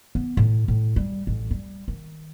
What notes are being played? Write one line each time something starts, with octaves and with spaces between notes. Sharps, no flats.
B3
A2
A2
G3
A1
G3
D#3